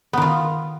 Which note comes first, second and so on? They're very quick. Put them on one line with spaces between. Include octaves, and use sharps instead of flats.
B3 D#3 F4